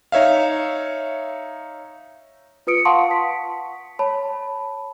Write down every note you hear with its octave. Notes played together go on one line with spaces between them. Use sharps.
D#4 C#5 E5 F5
F4 B4 D#6 C#7 D7
F5 F#5 A5 C6 C#6 D#6
B6
C#5 A5 B5